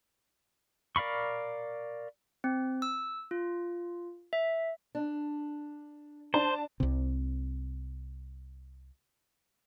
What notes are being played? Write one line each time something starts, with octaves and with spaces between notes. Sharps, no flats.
A#4 D5 F5 B5 C#6
C4
E6
F4
E5
D4
D4 C5 A5
C2 C3